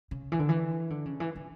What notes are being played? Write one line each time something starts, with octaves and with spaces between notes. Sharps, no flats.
C#3
E3
D3
E3
D3
C#3
E3
D3